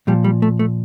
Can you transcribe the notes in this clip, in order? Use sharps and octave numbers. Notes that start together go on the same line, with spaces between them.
A#2 F3 G3
G3
A3
A3